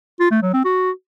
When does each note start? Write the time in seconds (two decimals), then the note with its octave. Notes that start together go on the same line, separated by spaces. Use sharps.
0.20 F4
0.31 A3
0.42 F#3
0.53 C4
0.65 F#4